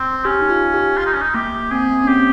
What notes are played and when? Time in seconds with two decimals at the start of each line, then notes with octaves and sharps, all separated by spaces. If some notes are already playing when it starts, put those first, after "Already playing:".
Already playing: C4
0.25 C#4 G4
0.42 D#4
0.50 F4
0.74 G4
0.98 F4
1.06 D#4
1.14 C#4
1.22 D#4
1.34 A#3 G4
1.71 C4 G#4
1.90 A#3
2.04 C#4
2.08 C4 G4